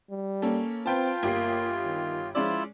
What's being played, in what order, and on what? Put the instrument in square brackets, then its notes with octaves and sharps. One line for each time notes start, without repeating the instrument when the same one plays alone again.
[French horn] G3
[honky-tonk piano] A#3 C#4 A4
[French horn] C4 [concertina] F4 [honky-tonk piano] B4 G5 A5
[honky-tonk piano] G1 G4 C7 [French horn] A#3
[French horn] D#3
[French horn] F3 [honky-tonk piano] G#3 C#4 D5 [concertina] E4 F4 E6